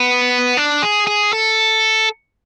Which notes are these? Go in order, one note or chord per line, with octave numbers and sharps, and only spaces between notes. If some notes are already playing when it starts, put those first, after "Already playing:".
Already playing: B3
D4
G#4
G#4
A4